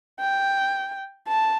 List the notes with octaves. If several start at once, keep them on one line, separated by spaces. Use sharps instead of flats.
G5
A5